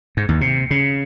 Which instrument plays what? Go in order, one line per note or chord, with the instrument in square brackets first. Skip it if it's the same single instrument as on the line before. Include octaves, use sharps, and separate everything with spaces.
[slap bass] G#2
D#2
C3
C#3